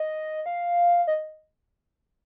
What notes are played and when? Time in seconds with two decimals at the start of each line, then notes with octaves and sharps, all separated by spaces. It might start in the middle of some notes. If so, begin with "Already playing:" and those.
Already playing: D#5
0.46 F5
1.07 D#5